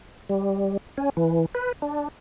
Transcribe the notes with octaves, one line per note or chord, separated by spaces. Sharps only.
G3
C#4
E3
B4
D4